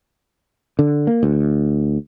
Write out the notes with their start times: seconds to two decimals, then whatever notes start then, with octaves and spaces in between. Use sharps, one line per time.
0.79 D3
1.07 A#3
1.23 D2